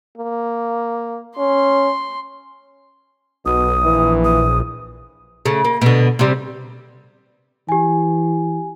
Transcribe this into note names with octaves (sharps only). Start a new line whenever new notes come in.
A#3
C#4 C6
B1 B2 D#6
A#1 E3
D#6
C#3 A3
A#3
B2 D3
C3 G3
E3 G4 G#5